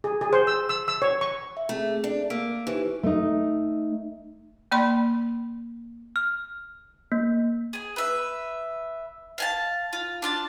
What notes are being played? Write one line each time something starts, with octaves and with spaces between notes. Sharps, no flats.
G#4
G#4
C5
E6
E6
E6
C#5
C#6
E5
A3 C4 G#4
D4
A#3 E6 B6 D7
E3 D#4 G4 C5
A3 D#4
A#3 D5 B5 C6
F6
A#3
G#4 G#5
B4 E5
F5 G#5 A5
F4
D4 F4 A5